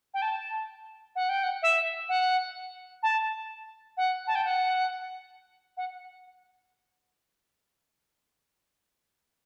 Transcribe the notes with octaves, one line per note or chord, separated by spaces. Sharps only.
G5
A5
F#5
G5
F#5
E5
F#5
A5
F#5
A5
G5
F#5
F#5